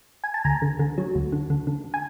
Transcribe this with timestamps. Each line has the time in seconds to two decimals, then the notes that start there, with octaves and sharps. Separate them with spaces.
0.24 G#5
0.34 A5
0.44 D2 G#5 A#5
0.62 D3
0.79 D3
0.98 F#3
1.15 D2
1.32 D3
1.50 D3
1.67 D3
1.94 G#5